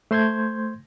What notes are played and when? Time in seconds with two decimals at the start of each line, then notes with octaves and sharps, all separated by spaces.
0.11 A3 C5 C6 G6 G#6